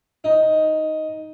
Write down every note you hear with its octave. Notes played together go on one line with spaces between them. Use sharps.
D#4